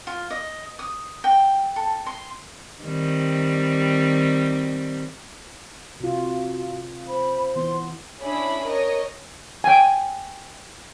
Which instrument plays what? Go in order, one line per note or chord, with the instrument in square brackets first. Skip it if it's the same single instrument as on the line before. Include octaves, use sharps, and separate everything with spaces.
[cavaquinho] F4
D#5
D#6
G5
A4
C6
[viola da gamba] D#3 G3 C4
[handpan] C3 F4 [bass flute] F#4
[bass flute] C5 [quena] B5
[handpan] E3 B3 [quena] C6
[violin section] C#4 D4 E4 G#4 B5
A#4 C#5 D#5
[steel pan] G5 G#5